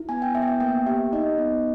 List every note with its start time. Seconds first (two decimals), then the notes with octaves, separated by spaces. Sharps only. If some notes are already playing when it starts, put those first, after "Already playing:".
Already playing: E4
0.09 B3 G#5
0.22 G5
0.35 B3 E5
0.42 G5
0.48 E5
0.60 A#3 G5
0.86 G4 E5
1.13 D#4 D#5
1.38 B3